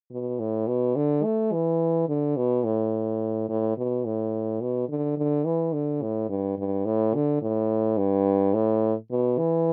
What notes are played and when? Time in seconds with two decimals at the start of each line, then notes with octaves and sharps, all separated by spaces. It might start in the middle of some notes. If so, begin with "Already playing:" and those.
0.11 B2
0.40 A2
0.67 B2
0.96 D3
1.24 A3
1.52 E3
2.09 D3
2.37 B2
2.64 A2
3.49 A2
3.77 B2
4.05 A2
4.61 B2
4.89 D3
5.17 D3
5.45 E3
5.74 D3
6.02 A2
6.29 G2
6.58 G2
6.85 A2
7.14 D3
7.42 A2
7.98 G2
8.54 A2
9.11 B2
9.38 E3